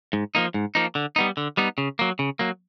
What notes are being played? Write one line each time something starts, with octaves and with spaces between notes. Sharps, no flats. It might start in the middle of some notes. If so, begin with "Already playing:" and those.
G#2
F3 A#3 D#4
G#2
F3 A#3 D#4
D3
G3 B3 D#4
D3
G3 B3 D#4
C#3
F#3 A#3
C#3
F#3 A#3